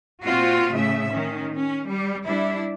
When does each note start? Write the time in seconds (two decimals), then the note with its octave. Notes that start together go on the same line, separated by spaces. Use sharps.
0.23 A#2 C4 F4 F#4
0.73 A2 C#3 A3 E5
1.11 D#3 C#4
1.54 C#4
1.89 G3
2.26 G3 D4 E4